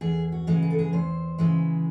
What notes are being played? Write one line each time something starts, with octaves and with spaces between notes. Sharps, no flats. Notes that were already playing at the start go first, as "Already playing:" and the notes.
E2 G#4
F#4
C#3 E3 G#3
G#4
A4
G#4
E2 C5
C#3 E3 G#3